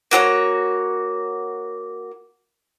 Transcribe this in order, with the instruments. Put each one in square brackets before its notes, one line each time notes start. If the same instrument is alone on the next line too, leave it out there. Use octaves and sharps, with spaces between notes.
[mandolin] A#3 F#4 C5 C#5